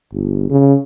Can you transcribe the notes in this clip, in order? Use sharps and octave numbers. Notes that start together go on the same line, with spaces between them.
G1
C#3